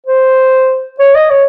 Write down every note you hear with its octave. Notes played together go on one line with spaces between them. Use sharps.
C5
C#5
D#5
C#5